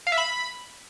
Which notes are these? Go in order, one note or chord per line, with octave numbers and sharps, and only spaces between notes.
F5
E5
B5